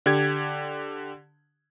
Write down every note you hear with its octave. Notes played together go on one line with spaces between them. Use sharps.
D3 G4 G#6